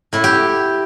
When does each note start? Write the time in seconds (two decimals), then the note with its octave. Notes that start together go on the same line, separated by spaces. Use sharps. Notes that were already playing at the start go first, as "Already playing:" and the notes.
0.13 A2 E4
0.24 G4